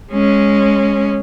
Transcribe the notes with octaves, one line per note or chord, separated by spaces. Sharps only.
G#3 C#4